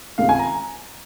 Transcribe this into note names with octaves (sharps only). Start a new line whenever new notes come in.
C#2 C3 D#3 F5
G#5
A#5